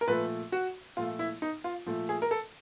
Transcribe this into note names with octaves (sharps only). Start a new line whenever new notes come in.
A#4
A#2 F3 A3 B4
F#4
A#2 F3 A3 F4
E4
D#4
F4
A#2 F3 A3
G#4
A#4
A4